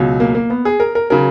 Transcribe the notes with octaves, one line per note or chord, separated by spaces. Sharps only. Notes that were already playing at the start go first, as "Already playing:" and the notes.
Already playing: C#2 B2 F#3
A#3
A#3
B3
G#4
A#4
A#4
C#3 F#3 A#4